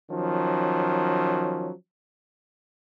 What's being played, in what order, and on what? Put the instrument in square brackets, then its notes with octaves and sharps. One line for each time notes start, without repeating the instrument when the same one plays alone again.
[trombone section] D#3 F3 F#3 C#4